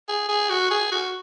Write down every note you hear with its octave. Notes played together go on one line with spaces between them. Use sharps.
G#4
G#4
F#4
G#4
F#4